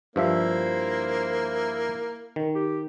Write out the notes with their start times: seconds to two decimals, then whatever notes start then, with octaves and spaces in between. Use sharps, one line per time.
0.16 G2 F3 A#3 E4 C5 E5
2.36 D#3
2.55 G4